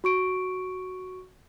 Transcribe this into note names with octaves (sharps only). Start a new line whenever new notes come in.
F#4 C#6 D7